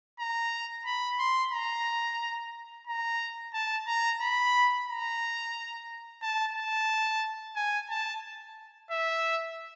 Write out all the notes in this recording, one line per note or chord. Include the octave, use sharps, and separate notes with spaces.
A#5
B5
C6
A#5
A#5
A5
A#5
B5
A#5
A5
A5
G#5
A5
E5